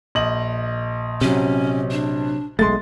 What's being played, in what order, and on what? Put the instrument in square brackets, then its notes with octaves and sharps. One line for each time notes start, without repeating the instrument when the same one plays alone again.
[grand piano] A#1 D#5 F#7
[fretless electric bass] C3 F#3 [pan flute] C#4
[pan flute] D4
[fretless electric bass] B1 G#3 A3 [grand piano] C6 A6